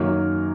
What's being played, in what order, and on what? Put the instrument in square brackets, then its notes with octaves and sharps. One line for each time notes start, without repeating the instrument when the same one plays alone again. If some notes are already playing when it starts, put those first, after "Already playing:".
Already playing: [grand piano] F#2 D#3 F#3 A#3 A#4